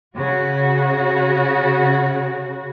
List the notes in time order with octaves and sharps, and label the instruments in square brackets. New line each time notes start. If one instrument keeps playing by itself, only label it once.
[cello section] C#3 F#4